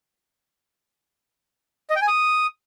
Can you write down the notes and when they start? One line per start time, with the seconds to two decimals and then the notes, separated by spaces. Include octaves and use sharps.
1.90 D#5
1.96 G5
2.02 G#5
2.07 D#6